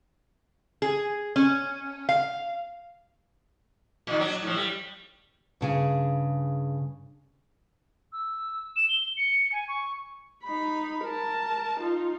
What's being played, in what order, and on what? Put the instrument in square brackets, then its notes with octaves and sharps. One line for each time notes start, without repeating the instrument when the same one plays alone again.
[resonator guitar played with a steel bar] G#4
C#4
F5
[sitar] A#2 D#3
F#3 D4
A2 F3
G3
[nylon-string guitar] G2 C#3 G#4
[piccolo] E6
E7
G7
C#7
G#5
C#6
[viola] D#4 B5
A#4 A5
D#4 F4